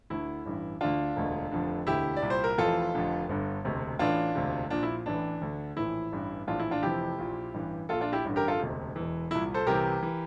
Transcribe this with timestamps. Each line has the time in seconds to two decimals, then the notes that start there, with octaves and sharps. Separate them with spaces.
0.10 D2 D3 E4
0.46 A1 G2 E3
0.81 D2 D3 D4 F4
1.16 E1 D2 D3
1.52 F1 F2 D3
1.87 E1 D2 D3 E4 G4
2.17 D5
2.22 C2 A#2
2.30 C5
2.44 A#4
2.58 F1 F2 E3 F4 A4
2.94 F1 F2 D3
3.29 G1 G2 D3
3.64 E1 D2 C3
3.99 A1 A2 E3 D4 F4
4.35 E1 D2 C3
4.70 A#1 A#2 D4
4.83 E4
5.06 A1 A2 E3 D4
5.41 D2 D3
5.77 A#1 A2 E3 E4
6.12 A1 G2 E3
6.48 A#1 A2 E3 D4 F4
6.59 E4
6.71 D4 F4
6.83 F1 F2 C3 E3 E4 G4
7.19 A#1 A#2
7.54 A1 G2 E3
7.89 A#1 A#2 F4 A4
8.01 D4 F4
8.13 E4 G4
8.25 A1 G2 D3
8.36 G4 A#4
8.48 F4 A4
8.60 E1 D2 C3
8.96 E1 E2 E3
9.31 C2 A#2 E4
9.54 A4 C5
9.67 C2 C3 E3 G4 A#4
10.03 E3